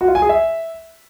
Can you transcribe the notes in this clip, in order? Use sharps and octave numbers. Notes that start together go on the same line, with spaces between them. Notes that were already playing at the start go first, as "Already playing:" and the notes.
F#4
F4
G#5
G#4
E5